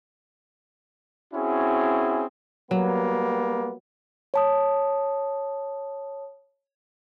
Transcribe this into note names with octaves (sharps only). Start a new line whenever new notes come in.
C4 C#4 E4 F#4 G#4
F#3 G3 A#3 B3
C#5 A5 D#6